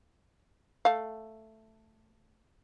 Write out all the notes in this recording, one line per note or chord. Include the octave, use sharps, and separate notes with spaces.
A3 F5